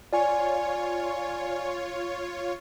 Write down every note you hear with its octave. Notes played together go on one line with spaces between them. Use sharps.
F4 C#5 D5 G#5